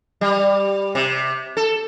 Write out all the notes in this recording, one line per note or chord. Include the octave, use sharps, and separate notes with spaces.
G3
C3
A4